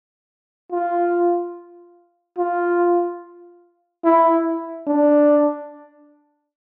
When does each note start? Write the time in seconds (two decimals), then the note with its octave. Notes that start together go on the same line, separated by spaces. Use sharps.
0.72 F4
2.38 F4
4.04 E4
4.87 D4